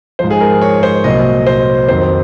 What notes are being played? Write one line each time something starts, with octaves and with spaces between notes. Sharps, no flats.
G#2 F3 C5
G#4
A#4
C#5
C5
C2 A#2 F#3 D#5
C5
F2 D#3 F#3 C5